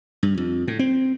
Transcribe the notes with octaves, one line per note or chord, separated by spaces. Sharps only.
G2
F2
A2
C4